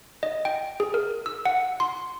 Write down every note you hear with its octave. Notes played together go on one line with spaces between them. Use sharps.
D#5
G5
G#4
A#4
E6
F#5
C6